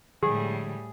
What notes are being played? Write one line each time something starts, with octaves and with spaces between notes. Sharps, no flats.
A2 D3 F3 G3 G#3 G4 G#4